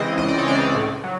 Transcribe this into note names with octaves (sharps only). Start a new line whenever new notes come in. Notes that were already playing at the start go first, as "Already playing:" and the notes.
Already playing: C#3 E3 G#3 C4 D#5
C#2 D#5
D5
C#5
C#3 E3 G#3 C4 D5
A2
F#3